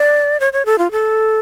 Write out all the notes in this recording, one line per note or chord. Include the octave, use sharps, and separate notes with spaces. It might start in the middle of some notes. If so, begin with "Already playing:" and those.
Already playing: D5
C#5
C#5
A4
F4
A4